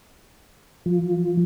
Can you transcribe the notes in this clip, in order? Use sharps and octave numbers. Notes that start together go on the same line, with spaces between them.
F3